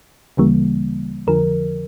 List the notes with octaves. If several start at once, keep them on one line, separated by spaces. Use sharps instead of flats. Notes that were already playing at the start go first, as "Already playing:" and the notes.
D2 C#3 E3 G3 A#3
F2 D3 F3 A#4